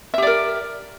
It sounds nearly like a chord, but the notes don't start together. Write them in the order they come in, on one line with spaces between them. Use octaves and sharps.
E5 G4 D5 A#4